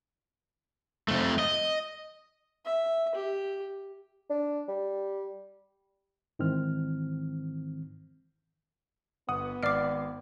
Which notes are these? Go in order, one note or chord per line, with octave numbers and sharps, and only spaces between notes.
F2 A3
D#5
E5
G4
D4
G3
G#2 D#3 E3 C4 F6
G1 B3 F#5 D#6
G#1 D5 D6 F6 C7